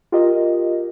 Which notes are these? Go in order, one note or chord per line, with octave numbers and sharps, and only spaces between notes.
F4 G4 A#4 D#5